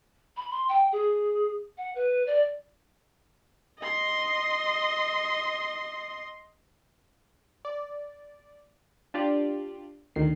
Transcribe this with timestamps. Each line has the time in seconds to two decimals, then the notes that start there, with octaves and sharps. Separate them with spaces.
0.37 B5
0.51 C6
0.69 G5
0.92 G#4
1.78 F#5
1.95 B4
2.27 D5
3.79 D#5 C6
7.65 D5
9.14 D4 F4 G4 D5
10.16 D2 D#3 C7